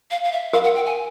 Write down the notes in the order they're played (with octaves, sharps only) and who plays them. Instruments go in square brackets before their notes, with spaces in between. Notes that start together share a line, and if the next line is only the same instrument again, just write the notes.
[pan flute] F5
F5
E5
[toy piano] A#4 [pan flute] F5
[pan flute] F#5
G5
G#5